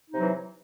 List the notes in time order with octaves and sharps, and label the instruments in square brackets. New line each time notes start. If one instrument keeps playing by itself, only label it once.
[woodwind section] D#4
C3
F#3
E3